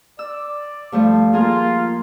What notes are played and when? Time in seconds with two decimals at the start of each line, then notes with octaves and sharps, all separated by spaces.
0.19 D5 E6
0.92 G2 F3 A3
1.33 A#3 F4 G#4 A#4